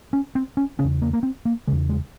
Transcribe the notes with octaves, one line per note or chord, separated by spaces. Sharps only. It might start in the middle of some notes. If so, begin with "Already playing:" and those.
C#4
C4
C#4
E2 C#3 C#4
A#3
A#3
C4
A#3
E2 C#3 G#3
G#3